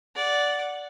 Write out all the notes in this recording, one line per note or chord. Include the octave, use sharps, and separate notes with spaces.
D5 F#5